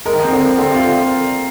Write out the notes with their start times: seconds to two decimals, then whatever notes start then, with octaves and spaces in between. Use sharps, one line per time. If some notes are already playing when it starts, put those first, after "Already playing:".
0.06 G#3 A#4
0.13 D#3
0.19 F3
0.23 C4
0.32 D3
0.41 F3 A#4
0.58 D3 C4
0.71 C3
0.75 F4
0.84 D3